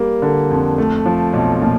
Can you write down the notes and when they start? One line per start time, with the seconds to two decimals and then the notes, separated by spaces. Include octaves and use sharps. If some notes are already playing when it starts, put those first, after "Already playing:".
Already playing: G3 A#3
0.22 D3
0.50 F2
0.78 A3
1.06 F3
1.34 B1
1.62 A#2